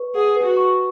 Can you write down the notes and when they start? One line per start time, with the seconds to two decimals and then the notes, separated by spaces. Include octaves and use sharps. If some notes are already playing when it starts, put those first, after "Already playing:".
Already playing: B4 C#6
0.15 G#4 F#5
0.36 B4
0.43 F#4
0.57 C#6